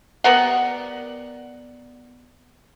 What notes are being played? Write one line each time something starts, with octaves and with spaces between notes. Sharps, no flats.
G3 B3 A#4 F#5